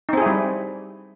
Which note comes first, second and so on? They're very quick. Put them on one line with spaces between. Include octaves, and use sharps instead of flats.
D#4 C4 G#4 E4 G3